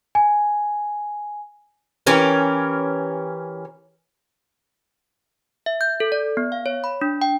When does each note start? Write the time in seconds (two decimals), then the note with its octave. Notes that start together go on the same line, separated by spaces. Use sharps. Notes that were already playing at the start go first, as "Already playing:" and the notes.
0.15 G#5
2.07 E3 C#4 G4 A#4
5.66 E5
5.81 G6
6.00 A4
6.12 D5
6.37 B3
6.52 F5
6.66 C#5
6.84 B5
7.01 D4
7.22 G5